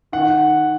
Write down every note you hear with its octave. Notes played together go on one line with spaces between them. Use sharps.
D#3 F#5